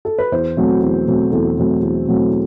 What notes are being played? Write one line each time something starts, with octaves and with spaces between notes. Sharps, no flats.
A4
B4
E2 C5
B2 F#3 A3 C4
E2
B2 F#3 A3 C4
E2 A4
B2 F#3 A3 C4
E2
B2 F#3 A3 C4